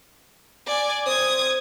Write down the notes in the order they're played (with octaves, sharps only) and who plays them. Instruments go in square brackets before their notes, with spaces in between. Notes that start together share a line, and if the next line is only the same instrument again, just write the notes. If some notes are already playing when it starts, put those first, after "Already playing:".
[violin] D5 G#5
[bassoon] C4 [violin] D#6 G#6